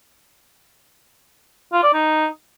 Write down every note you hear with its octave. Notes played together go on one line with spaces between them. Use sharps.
F4
D5
D#4